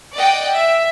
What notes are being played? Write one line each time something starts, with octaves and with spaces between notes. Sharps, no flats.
D5 D#5 F#5 G5
E5